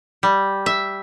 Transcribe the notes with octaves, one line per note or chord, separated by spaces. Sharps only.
G3
E5